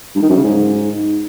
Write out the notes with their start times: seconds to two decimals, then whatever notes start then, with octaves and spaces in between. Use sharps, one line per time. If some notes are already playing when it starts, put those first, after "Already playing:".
0.15 G2
0.22 D#3
0.29 F#2
0.37 C#3
0.44 G#2